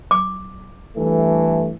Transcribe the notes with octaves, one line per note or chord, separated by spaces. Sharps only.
D6
G2 E3 A3